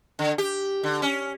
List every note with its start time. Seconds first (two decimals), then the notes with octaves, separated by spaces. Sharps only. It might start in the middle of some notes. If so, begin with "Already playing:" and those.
0.19 D3
0.38 G4
0.84 D3
1.02 C#4